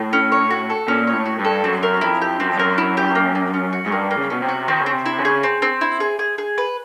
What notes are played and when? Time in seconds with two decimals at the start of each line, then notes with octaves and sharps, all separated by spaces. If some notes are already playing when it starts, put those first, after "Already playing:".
Already playing: A2
0.13 C#4
0.32 C#5
0.51 F#4
0.70 A4
0.88 A#2 C#4
1.07 C#5
1.13 A2
1.26 F#4
1.39 G2
1.45 A4
1.64 F#2 C4
1.83 A#4
2.01 F2 E4
2.21 G4
2.40 F#2 C4
2.49 F2
2.57 F#2 A#4
2.78 E4
2.97 G4
3.15 A#3
3.35 A#3
3.54 C#4
3.73 F#4
3.86 G#2
3.91 G2 A#3
4.11 A#3
4.17 C#3
4.30 B2 C#4
4.42 C3
4.49 F#4
4.68 D#3 C4
4.81 C#3
4.86 C4
4.93 C3
5.06 E4
5.19 C#3
5.25 G#4
5.43 C4
5.62 C4
5.81 E4
6.00 G#4
6.19 G#4
6.38 G#4
6.58 B4